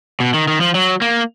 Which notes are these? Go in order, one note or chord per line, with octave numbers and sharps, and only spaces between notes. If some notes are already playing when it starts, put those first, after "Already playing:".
B2
D#3
D#3
F3
F#3
A#3